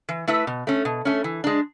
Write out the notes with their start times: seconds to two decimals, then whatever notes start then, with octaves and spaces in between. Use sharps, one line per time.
0.09 E3
0.28 A3 E4 B4 E5
0.47 B2
0.67 A3 C#4
0.85 B2
1.05 A3 C#4
1.24 E3
1.44 G#3 D4